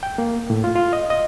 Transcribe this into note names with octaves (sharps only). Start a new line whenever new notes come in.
G5
A#3
A2
F4
F4
D#5
D#5